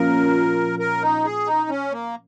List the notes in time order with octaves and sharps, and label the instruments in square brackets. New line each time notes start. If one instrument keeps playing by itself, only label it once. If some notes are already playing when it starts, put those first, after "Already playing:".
Already playing: [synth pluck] A#2 F3 A#3 C#4 F4 [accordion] A#4
[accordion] A#4
D#4
G#4
D#4
C#4
A#3